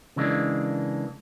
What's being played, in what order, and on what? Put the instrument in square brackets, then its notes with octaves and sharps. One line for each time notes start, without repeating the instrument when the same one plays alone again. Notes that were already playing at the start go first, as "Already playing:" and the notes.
[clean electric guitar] C#3 E3 G#3 A#3 D4